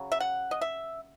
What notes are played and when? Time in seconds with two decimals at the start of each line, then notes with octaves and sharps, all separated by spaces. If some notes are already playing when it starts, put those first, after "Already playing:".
Already playing: C#3 F#3
0.12 E5
0.20 F#5
0.51 D#5
0.61 E5